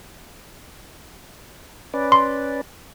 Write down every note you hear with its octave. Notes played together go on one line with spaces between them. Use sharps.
C#4 B4 D5
C6